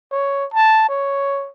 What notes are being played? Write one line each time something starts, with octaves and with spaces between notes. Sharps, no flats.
C#5
A5
C#5